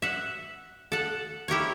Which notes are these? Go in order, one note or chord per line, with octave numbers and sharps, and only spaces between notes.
E5 F#5
A4 F#5
E4 G4 A#4 C#5